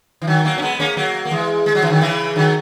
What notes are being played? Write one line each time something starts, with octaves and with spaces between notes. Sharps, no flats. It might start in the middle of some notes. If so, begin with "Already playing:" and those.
E3
D#3 F#3
F#3 A#3
C#4
G#3 B3
A#3 C#4
F#3 A#3
A#3
E3 G#3
G#3
F#3
E3
D#3 F#3
C#3 E3
D#3 F#3